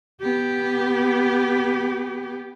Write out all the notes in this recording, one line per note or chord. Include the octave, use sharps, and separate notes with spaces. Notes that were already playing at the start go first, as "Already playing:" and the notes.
B3 G4